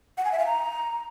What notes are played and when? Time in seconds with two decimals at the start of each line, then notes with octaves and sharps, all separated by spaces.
0.18 F#5
0.25 G#5
0.32 E5
0.39 F5
0.46 A#5